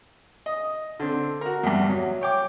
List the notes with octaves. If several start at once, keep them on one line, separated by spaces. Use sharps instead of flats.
D#5
D3 C4
F#4 A#4
E2 G2
F#3
C#5 G5 D6